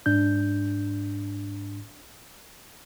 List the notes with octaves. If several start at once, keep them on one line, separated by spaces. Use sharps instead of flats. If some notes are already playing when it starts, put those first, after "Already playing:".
G#2 D4 G6